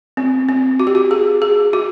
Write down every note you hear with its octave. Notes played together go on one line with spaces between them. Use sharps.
C4
C4
F#4
G4
F#4
G#4
G#4
F#4